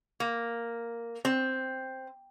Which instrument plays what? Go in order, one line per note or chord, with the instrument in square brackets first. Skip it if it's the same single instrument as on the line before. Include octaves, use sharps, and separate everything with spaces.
[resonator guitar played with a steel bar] A#3
C4